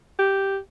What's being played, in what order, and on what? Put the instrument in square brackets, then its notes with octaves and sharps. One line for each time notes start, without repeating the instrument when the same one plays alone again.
[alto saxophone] G4